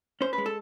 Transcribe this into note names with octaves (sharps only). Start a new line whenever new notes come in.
C#4 C5
B4
G#3
A4